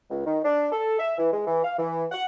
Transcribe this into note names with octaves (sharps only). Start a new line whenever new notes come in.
C#2
D#3
D4
A4
E5
E3
G#3
E3
F5
E3
F#5